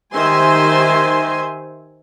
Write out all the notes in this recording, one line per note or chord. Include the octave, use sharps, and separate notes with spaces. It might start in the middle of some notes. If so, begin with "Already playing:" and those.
D#3 G4 C5 E5 G#5 C6